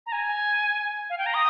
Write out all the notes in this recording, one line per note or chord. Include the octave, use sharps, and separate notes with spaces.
A#5
G#5
F5
G5
A#5
D#6